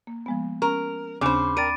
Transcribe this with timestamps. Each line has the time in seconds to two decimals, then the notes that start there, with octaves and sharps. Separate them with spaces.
0.07 A#3
0.26 F3 G#3 B3
0.62 C#4 A#4
1.21 D#2 C#3 C4 D4 C5 B5 D6
1.57 A#4 D5 G5 A#5 A6 D7 D#7